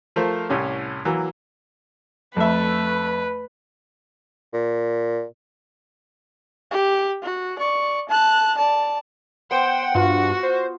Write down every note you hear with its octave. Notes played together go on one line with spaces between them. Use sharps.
F3 A3 A#4 C5
C2 A2 C#4 G4
E3 F#3 A#3
F2 A3 B4 E5
A#2
G4
F#4
D5 C#6
A5 F#6
D5 A5
B3 C5 F#5 G5
G2 F4 F#4
C5